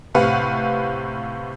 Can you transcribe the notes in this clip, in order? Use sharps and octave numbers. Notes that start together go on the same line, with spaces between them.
A2 C3 B4 F5 F#5